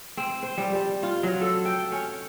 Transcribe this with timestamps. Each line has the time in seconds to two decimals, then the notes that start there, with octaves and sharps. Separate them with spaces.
0.17 C4
0.43 C5
0.58 G3
0.75 G3
1.03 F4
1.23 F#3
1.41 A4
1.65 G5
1.92 C#4